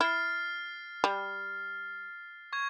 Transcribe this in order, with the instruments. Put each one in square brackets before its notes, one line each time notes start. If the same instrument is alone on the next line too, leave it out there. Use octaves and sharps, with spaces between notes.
[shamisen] E4 [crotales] F6 A6 C7
[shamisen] G3
[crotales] C#6 G#6